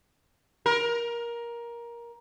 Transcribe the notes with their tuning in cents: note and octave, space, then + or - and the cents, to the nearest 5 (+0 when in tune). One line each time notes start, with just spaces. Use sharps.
A#4 +15